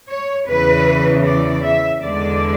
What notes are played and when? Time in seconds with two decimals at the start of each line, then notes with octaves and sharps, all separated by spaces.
0.09 C#5
0.47 E2 C#3 E3 B4
1.25 D5
1.64 E5
2.03 E2 D3 G#3 D4 D5